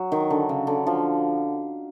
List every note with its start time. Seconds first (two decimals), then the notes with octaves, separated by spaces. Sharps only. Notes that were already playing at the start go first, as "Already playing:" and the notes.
Already playing: F#3
0.12 D#3
0.30 D3
0.49 C#3
0.67 D3
0.87 F3